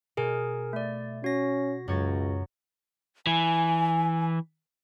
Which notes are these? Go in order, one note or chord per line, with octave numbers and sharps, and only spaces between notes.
B2 G#4 A#4 G#5
A3 D5
C#4 F#4 A#6
C#2 F#2 C#5 A6
E3 G#5